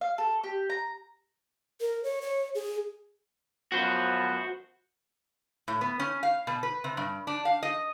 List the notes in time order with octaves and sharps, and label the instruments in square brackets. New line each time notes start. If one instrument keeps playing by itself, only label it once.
[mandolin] F5
A4
G4
A#5
[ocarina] A#4
C#5
C#5
G#4
[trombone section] F#2 F3 B3 [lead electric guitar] F#4 C5
[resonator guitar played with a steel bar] A2
B3
C#4
F5
B2
B4
C3
G2
D4
F5
D#5